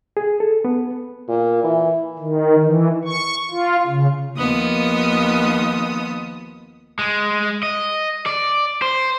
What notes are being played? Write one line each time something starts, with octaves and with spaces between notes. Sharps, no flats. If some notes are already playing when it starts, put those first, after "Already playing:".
G#4
A4
B3
A#2
E3
D#3
E3
C#6
F4
C#3
D#2 F3 B3 D#6
G#3
D#5
D5
C5